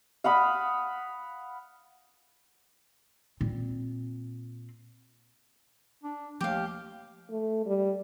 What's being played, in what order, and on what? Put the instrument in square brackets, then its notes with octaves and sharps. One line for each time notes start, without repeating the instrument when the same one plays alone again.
[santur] F5 F#5 B5 D#6
[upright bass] A#2 C4
[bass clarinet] D4
[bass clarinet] D#2 [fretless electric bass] F3 A3 [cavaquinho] G4 F5
[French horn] A3
G3